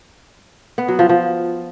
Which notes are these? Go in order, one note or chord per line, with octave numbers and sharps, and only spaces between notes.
B3
F#3
F3
F3